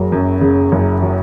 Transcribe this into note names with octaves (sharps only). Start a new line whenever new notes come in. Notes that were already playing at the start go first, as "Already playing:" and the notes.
Already playing: F#1 F#3 G#4
F#2
C#3
F#1
F#3